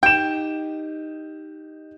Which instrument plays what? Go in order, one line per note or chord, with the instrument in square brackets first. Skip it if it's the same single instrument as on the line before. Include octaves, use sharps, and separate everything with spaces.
[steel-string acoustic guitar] D#4 G4 [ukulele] G5 [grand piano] G6 E7